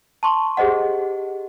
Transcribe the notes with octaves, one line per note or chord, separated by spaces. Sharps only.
A5 C6 C#6
G4 G#4 C5 D#5 F#5